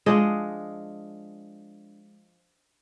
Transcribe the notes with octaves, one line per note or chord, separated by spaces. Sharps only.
F3 G#3 D4 D#5